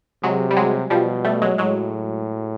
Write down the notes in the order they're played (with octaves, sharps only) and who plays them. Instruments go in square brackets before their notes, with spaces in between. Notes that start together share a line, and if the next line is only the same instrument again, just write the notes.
[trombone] C3 [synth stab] F#3 G#3
[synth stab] G3
F#3 G#3
[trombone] B2 [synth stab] F3 G3
[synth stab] G3 A3
F#3 G#3
[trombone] A2 [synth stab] F#3 G#3